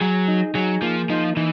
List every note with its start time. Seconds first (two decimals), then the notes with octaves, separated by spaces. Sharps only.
0.01 F#3 G#4
0.28 D#4
0.55 F#3 G#4
0.82 F3 A#3
1.10 F3 D#4
1.37 E3 D#4